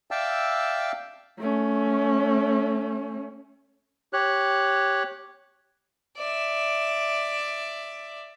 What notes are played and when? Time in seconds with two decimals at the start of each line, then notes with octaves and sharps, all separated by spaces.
0.11 D5 E5 F5 G5 A5 E6
1.38 A3 C#4
4.13 G4 C#5 F#6
6.17 D5 E5